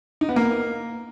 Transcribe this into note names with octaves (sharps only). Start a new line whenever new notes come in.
D#4
B3
A#3